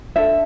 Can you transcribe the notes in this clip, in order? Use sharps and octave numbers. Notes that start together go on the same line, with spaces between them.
D4 A4 E5